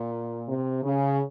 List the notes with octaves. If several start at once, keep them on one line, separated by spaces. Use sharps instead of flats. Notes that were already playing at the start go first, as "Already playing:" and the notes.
Already playing: A#2
C3
C#3